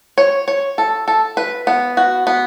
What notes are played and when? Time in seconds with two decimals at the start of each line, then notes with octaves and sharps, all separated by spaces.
0.18 C#5
0.48 C#5
0.78 A4
1.08 A4
1.37 B4
1.67 B3
1.97 F#4
2.27 B3